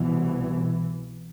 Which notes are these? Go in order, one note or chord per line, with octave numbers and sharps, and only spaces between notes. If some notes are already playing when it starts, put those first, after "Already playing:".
Already playing: C2 B2 E3